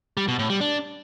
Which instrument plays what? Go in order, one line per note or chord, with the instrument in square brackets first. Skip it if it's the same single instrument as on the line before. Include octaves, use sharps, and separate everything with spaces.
[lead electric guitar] G3
B2
A2
G3
D4